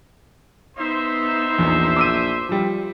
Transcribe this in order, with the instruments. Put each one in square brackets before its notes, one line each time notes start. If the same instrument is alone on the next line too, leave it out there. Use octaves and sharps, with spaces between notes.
[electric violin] B3 D#4 [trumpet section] C5 E5
[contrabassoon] A#1 [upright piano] E2
[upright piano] D6 E6 D#7
F3 G3